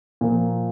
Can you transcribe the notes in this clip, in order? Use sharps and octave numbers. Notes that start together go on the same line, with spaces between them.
A#2 F3 A#3